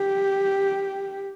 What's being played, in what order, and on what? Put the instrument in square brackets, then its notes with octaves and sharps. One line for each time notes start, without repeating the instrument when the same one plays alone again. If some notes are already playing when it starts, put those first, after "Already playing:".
Already playing: [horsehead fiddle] G4